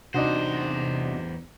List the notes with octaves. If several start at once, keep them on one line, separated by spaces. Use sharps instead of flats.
E2 C3 D4 D#4 F#4 C5